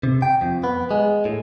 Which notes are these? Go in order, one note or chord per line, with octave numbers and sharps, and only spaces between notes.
C3
G5
F2
B3
G#3
A2